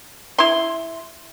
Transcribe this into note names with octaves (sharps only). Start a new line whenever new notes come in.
E4 C6